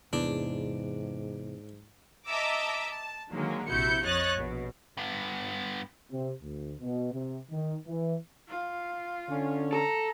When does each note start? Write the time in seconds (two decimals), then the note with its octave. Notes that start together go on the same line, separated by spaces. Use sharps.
0.13 E2 G#2 C3 E3 A#3 D4
2.26 D#5 E5 A5 A#5 D6 E6
2.87 A5
3.30 D3 D#3 F#3 G#3 A#3
3.67 A#1 C3 E4 F#4 G6 C#7
4.04 F2 C#5 D#5 F#6 A6
4.37 A#1 B2
4.97 G2 B3
6.11 C3
6.42 D2
6.80 B2
7.13 C3
7.51 D#3
7.87 E3
8.48 F4
9.30 D3 C#4
9.73 A4 A#5